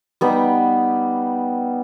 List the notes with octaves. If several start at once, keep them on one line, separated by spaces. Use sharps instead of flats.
G3 B3 D#4